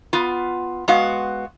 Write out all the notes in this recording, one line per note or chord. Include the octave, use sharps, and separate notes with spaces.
B3 F4
G#3 B3 F#4 F5